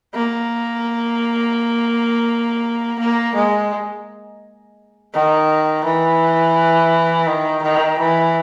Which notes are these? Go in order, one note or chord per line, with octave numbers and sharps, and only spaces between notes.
A#3
A#3
G#3
D#3
E3
D#3
D#3
E3